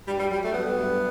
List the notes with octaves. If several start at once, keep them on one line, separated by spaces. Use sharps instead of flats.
G2 G3
G3
F#3 G3
A3
F#3 B3
G2